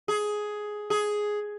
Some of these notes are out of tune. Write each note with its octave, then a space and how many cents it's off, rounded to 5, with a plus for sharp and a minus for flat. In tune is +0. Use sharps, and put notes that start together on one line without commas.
G#4 +10
G#4 +5